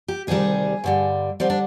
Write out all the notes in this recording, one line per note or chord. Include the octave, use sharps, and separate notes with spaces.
G4
D2 C3 D#3 G3 G#4
G2 D3 G3
D3 G3 C4
D4